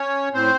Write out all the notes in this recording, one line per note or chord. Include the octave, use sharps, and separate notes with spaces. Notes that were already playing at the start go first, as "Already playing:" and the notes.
Already playing: C#4 C#5
A2 C4 C5